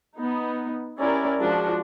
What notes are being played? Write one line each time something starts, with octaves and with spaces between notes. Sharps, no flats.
B3 D#4
C#4 E4 G4 A#4 D5
F3 G#3 D4 F#4